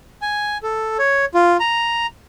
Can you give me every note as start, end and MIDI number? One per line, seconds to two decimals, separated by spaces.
0.22 0.58 80
0.63 0.97 69
0.99 1.25 73
1.34 1.57 65
1.60 2.06 82